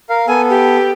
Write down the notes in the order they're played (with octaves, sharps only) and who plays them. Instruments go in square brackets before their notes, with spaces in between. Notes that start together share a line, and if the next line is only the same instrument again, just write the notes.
[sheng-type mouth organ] A#4 F5
[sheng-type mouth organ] B3 A4 [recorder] G#5
[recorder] G4